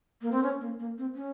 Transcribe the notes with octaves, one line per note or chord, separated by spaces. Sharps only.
A#3
C4
C#4
A#3
A#3
C4
C#4